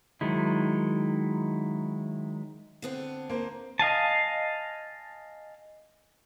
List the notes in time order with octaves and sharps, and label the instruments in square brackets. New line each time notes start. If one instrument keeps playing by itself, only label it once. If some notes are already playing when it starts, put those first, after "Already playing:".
[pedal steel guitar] D#3 F#3 G#3 E4
[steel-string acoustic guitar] D3 B3 C4
[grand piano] A#3 C5
[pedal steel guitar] D#5 F5 G#5 A5